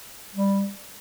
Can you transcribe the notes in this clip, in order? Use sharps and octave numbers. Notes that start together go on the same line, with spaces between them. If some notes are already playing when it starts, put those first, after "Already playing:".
G3